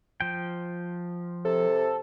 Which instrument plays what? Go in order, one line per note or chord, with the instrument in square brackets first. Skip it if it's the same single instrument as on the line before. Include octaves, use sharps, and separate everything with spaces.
[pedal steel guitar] F3 G5
[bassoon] C3 [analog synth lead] A4